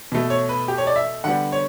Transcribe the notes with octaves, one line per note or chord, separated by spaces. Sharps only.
B2 A3
C#5
B4
G4
C#5
D5
E5
D3 G3 B3 F#5
C#5